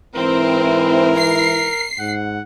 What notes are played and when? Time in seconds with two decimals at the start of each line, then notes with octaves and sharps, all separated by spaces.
0.16 G#2 E3 C4 E4 A#4
1.16 C7
1.99 G#2 F#5